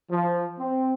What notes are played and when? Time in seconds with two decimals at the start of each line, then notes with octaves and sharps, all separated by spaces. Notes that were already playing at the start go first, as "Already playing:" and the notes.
0.11 F3
0.59 C4